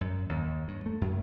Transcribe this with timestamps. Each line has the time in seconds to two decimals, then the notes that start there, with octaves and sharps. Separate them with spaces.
0.01 F#2
0.29 D#2
0.68 G2
0.86 A3
1.01 F#2